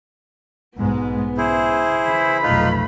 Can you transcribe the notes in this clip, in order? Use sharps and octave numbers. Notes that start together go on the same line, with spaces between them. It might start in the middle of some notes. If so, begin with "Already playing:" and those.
B1 G#2 G#3 B3
C#3 E4 G#4 C5
C#3 E3 B5
F1 B1 A3 D#4 F4 B4